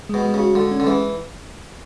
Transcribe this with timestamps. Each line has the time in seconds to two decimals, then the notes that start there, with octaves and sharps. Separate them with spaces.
0.09 B2 G#3
0.25 G#3
0.34 C#3
0.39 F#4
0.55 D3 G#3
0.71 C#4
0.80 D3
0.87 E3 G#3